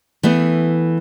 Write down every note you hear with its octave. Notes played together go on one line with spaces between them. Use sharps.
E3 A3 B3